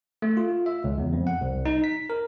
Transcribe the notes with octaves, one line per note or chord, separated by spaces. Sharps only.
A3
F4
E5
C#2
E2
F2
F#5
C2
D#4
B6
A#4